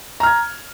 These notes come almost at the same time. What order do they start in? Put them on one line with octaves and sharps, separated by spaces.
A#5 F6 G#6